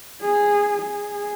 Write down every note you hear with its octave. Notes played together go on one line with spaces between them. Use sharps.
G#4
G#4